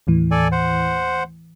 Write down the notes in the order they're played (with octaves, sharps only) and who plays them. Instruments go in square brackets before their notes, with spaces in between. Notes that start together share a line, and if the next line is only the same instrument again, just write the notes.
[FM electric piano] D#2 A2 E3
[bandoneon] A4 D5 G#5
C5 F#5